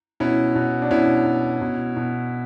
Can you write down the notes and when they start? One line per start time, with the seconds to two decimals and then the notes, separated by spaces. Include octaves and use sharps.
0.20 B2 C#4 E4
0.55 B2
0.82 D4
0.91 B2 C#4 E4
1.26 B2
1.61 B2
1.96 B2